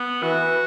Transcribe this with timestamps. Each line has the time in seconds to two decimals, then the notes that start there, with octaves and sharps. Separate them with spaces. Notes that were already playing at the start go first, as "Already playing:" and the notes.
Already playing: B3
0.23 E3 F#4